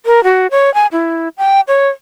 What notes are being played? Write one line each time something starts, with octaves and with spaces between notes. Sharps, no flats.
A#4
F#4
C#5
G#5
E4
G5
C#5